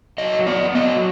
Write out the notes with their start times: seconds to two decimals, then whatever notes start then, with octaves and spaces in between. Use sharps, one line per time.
0.18 F#3 D#5
0.47 B3 D5
0.75 F#3 D#5